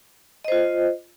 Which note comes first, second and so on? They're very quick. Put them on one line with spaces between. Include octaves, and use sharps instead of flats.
D#5 C5 F4